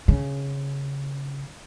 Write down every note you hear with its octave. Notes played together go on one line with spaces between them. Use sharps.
C#3